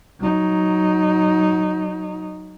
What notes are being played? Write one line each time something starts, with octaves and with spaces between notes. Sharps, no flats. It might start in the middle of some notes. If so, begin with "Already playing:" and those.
F#3 D#4